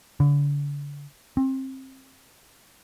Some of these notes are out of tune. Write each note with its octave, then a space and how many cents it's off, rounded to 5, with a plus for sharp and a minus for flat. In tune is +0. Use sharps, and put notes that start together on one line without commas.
D3 -35
C4 +25